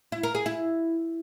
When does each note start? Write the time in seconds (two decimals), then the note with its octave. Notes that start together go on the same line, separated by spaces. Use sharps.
0.12 E4
0.23 A#4
0.35 G#4
0.46 E4